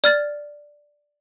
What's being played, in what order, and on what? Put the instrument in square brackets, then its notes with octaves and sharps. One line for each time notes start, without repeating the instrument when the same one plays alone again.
[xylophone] D5 F6 A6